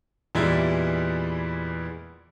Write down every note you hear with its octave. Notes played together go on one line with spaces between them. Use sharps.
E2 A#2 E3 G3 G#3 E4